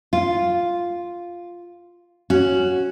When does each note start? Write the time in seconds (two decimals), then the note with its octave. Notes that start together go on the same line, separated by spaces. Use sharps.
0.13 F4
2.30 C#4 F#4